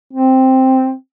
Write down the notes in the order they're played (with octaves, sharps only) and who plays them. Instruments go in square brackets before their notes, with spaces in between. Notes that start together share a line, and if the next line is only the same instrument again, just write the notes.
[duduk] C4